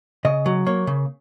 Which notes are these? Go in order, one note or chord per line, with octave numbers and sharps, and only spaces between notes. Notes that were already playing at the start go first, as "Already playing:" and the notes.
C#3 D#5
F#3
A#3 C#5
C#3